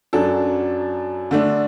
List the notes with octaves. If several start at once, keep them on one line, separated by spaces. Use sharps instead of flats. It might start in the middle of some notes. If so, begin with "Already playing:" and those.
F#2 F#3 D4 A4
D3 A3 D4